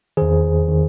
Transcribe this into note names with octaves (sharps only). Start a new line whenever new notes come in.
E2 D#3 G#4 C5
D#3